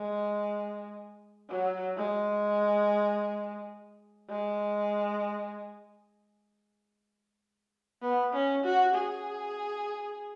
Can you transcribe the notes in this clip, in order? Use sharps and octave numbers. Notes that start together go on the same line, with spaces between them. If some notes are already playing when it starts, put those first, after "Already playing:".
Already playing: G#3
F#3
G#3
G#3
B3
C#4
F#4
G#4